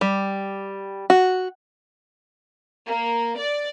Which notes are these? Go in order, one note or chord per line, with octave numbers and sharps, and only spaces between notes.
G3
F#4
A#3
D5